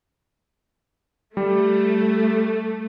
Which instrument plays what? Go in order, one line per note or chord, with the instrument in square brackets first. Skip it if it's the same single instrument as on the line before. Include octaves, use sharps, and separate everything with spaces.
[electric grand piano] G3 [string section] A3